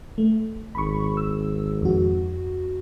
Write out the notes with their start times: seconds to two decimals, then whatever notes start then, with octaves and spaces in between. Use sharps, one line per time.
0.18 A3
0.75 G#1 B5 C#6
1.17 E6
1.82 F2 F#4